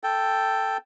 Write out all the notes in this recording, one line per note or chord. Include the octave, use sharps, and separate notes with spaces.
A4 G5